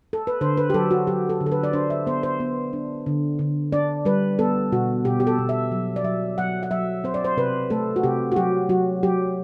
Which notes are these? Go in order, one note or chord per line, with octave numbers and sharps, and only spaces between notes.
A4
B4
D3 C5
B4
G4
F#3 A4
F#4
F#3 G4
A4
D3
A4
B4
D5
D4 C5
E5
B3 C5
C5
B3
D4
D3
D3
D4 D5
G3 B4
B3 A4
B2 F#4
B2 G4
G4
A4
B2
E5
F#3
D5
F#3 E5
F#3 F#5
F#5
F#3 E5
C4 C5
D5
C5
C3 B4
A3 A4
F#4
C3 G4
F#4
F#3 G4
F#3 F#4
F#3 G4